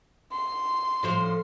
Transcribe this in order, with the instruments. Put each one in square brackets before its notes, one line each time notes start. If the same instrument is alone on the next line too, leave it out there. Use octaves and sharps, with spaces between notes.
[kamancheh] C6
[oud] A2 F3 C5